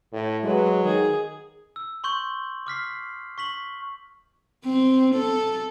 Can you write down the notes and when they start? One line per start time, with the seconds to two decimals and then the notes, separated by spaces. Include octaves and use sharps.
0.12 A2
0.44 F#3 G#3 B4
0.84 D#3 G#4
1.76 E6
2.04 C6 C#6 G6 F#7
2.67 D6 F6 B6 C7
3.38 C#6 B6 F#7
4.65 C4
5.15 A4